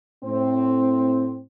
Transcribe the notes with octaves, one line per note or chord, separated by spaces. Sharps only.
A2 C4